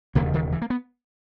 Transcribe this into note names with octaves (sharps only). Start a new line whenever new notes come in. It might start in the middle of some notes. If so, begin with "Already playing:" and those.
E1 D#2 C#3 A#3
D#3
E3
A#3
B3